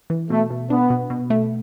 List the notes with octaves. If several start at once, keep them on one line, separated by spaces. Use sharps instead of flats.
E3
B2 A3
B2
B3 D4
B2
B2
A3